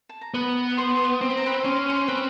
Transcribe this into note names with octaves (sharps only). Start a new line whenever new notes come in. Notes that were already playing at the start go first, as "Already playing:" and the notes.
A5
A#5
B3 B4 B5
C5 C6
C4 C6
B5
A#5
B4 B5
C#4 C6
C5 C6
C4 B4 B5